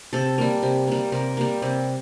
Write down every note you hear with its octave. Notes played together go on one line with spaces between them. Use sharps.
C3 A4
G3 A#3
C3
G3 A#3
C3 A#4
G3 A#3
C3